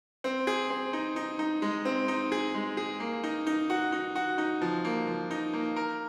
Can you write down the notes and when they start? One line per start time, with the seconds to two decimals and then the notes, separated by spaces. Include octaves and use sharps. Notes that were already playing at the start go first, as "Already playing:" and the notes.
0.24 C4
0.47 G#4
0.70 C4
0.93 D#4
1.16 D#4
1.39 D#4
1.62 G#3
1.85 C4
2.08 D#4
2.32 G#4
2.55 G#3
2.77 G#4
3.00 A#3
3.23 D#4
3.47 D#4
3.70 F#4
3.92 D#4
4.16 F#4
4.38 D#4
4.62 F3
4.85 A#3
5.07 F3
5.31 D#4
5.53 A#3
5.76 A#4